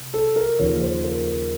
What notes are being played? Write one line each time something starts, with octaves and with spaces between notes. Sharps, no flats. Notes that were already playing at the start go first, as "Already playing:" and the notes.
Already playing: C3
A4
A#4
D#2 C#3 F3 C#5
C5
A#4
A#4